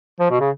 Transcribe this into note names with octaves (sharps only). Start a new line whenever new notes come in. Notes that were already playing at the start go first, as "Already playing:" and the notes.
F3
B2
C#3